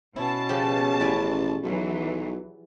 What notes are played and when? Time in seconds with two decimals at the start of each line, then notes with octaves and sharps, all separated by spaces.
0.16 B2 C#4 E4 A5
0.49 C#3 F3 G4
1.00 A1 B4 D5 G#5
1.63 B1 E3 F#3